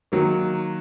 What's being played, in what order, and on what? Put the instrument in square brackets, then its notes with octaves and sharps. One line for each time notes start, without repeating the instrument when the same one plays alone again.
[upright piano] D#3 F#3 A#3